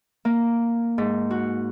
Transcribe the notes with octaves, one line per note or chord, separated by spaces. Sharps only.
A#3
G#2
F#4